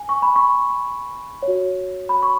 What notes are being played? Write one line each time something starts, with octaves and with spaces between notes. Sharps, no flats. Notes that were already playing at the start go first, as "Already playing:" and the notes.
Already playing: G#5
C#6
B5
C#6
C#5
F#4
B5
C#6